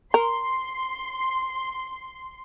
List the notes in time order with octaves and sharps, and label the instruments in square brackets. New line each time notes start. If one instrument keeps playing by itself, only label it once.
[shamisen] A#4 [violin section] C6